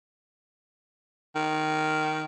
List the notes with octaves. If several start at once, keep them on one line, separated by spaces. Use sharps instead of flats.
D#3